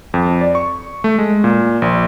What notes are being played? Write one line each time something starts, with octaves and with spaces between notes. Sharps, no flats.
F2
D5
C#6
A3
G#3
A#2
A#1